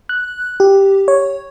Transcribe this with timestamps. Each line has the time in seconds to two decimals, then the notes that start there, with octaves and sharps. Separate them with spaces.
0.09 F#6
0.60 G4
1.08 C#5